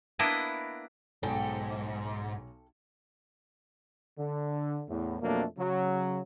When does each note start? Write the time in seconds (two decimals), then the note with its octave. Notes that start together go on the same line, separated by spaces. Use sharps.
0.19 A#3 B3 D4 E4 D#5 A5
1.23 B1 G#2 A4 G5 G#5
4.18 D3
4.89 E2 A2
5.22 F2 B2 F#3 A3 A#3 D4
5.58 C#3 F#3